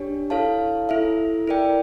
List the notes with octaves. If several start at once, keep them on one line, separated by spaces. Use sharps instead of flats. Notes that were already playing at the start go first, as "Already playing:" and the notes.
Already playing: D4 G4 C#5
E4 A4 C#5 F5 A5
E4 A4 E5
E4 A#4 D5 G5